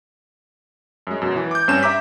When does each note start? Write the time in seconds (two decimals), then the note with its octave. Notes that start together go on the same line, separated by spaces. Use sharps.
1.07 F#2 G#3
1.22 F#2 B2
1.36 E3
1.51 D6 G6
1.68 G2 C4 C#4 E7
1.83 E5 A#5 D6 B6